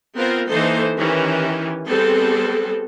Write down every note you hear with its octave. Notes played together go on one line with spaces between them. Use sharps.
B3 C4 F4 A#4
E3 A#3 D#4 A4 C5
D#3 E3 C#4 G4
G3 B3 C4 G#4 A4